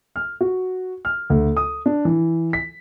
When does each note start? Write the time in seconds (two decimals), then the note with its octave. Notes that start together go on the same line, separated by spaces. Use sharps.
0.16 F6
0.41 F#4
1.05 F6
1.30 D2
1.57 D#6
1.86 D4
2.05 E3
2.53 B6